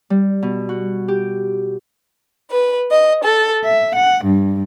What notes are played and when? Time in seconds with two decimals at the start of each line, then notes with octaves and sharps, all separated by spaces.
0.10 G3
0.42 B2
0.69 F#4
1.08 G4
2.51 B4
2.91 D#5
3.23 A4
3.64 E5
3.95 F#5
4.25 G2